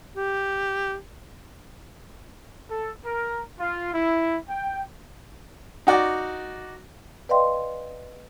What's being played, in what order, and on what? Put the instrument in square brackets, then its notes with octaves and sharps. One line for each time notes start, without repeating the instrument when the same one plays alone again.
[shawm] G4
[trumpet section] A4
A#4
F4
E4
G5
[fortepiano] D#4 F#4 D5
[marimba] B4 D5 D#5 F5 G5 C6